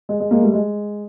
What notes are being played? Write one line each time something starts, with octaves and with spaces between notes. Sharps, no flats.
G#3
G#3
G#3 A#3
G3 A3
G#3